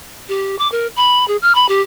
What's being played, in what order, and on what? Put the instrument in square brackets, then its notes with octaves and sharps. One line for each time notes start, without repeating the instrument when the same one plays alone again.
[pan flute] G4
D6
A#4
B5
G#4
F6
B5
G4